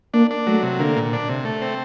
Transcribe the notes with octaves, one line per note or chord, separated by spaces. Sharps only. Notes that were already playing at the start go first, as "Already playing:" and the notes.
A#3 D4
D4
F#3 A3
C3
D3 A#3
A#2
D4
C3
A3
C4